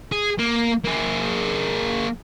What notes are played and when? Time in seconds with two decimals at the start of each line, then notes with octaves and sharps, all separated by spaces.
0.12 G#4
0.38 A#3
0.84 A#3 G#4